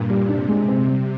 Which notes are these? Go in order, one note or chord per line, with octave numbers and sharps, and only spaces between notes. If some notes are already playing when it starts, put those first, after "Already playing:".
Already playing: G2 A#2
G3
C3 D4
G#3
C4
G3